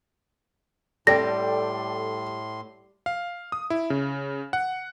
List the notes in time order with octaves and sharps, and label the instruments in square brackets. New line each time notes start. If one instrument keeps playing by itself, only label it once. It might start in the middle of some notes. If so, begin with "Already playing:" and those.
[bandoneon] A2 C6 [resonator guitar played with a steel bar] G3 [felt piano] A4 D5 G5 [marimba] A#6
[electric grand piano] F5
D#6
E4
C#3
F#5